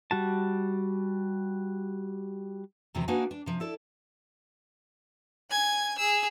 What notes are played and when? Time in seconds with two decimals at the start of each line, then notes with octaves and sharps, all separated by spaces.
0.11 G3 F#4 A5
2.95 E2 C3 D#3 F3 C4
3.08 A#3 D4 D#4 F#4 B4 G#5
3.31 D4
3.46 C3 F3
3.60 E4 A4 D5
5.50 G#5 G#6
5.98 G#4 E6